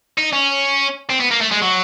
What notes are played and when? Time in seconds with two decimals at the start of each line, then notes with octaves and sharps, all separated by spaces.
0.18 D#4
0.33 C#4
1.10 C4
1.20 B3
1.31 A#3
1.41 A3
1.51 G#3
1.62 F#3